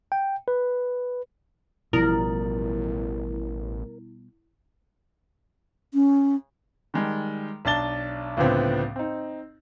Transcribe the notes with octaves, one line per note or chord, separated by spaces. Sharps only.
G5
B4
A1 B2 F3 G3 E4 A#4
C#4
D#3 G3 G#3
B1 D4 A5 A6 G7
C#2 A2 D3 F3 B3 C4
C4 D#4